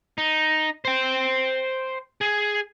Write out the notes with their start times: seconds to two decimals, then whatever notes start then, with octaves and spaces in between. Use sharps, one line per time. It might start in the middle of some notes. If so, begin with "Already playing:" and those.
0.18 D#4
0.85 C5 G5
2.21 G#4